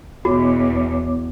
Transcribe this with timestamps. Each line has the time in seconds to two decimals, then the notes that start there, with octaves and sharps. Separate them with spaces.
0.25 E2 B2 B3 F#4 C#5 D6